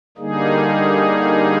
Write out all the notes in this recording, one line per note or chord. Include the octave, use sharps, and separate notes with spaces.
D3 G3 A#3 D#4 G#4